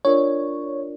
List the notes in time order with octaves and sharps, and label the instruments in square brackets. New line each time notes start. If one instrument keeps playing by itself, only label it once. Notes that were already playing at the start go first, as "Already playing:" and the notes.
[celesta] D4 F4 A#4 D5 [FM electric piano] C#5